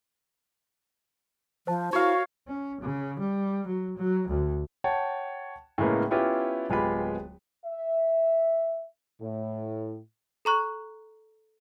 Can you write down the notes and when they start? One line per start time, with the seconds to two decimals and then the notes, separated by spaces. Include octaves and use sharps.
1.67 F3 C5 A5
1.93 E4 F#4 C#5 F5
2.48 C#4
2.81 C#3
3.19 G3
3.67 F#3
3.97 F#3
4.28 D2
4.84 C#5 F#5 G5 A5
5.78 A2 C#3 G#3 A#3 B3
6.11 B3 C#4 E4 F4 G4
6.70 D1 G#3 B3 F4 G4 B5
7.65 E5
9.21 A2
10.45 A4 A#5 C#6 F#6